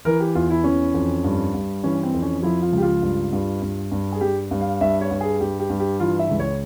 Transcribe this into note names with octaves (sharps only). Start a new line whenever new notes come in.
E3 A#4
G4
E2 F4
E4
E3 C#4
F2
G2
G2
E3 C#4
C4
F2
C#4
F3 E4
F4
C#2 G4
F4
G2
G2
G2
G2
G#4
G2 G4
G2
F5
G2 E5
C#5
G2
G#4
G2 G4
G4
G2
G4
E3 F4
E5
C#2
C#5